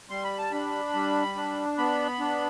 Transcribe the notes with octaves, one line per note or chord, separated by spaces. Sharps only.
G3 C6
B5
A5
D4 B5
G3
D4
B3 B5
D4